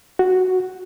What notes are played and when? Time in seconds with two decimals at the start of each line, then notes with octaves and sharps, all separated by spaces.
0.19 F#4